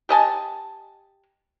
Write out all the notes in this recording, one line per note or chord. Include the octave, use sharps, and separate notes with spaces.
G4 D#5 G#5 A5